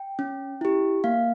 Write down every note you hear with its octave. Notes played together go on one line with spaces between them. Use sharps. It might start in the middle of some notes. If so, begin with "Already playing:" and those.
Already playing: G5
C#4
E4 G4
A#3 F5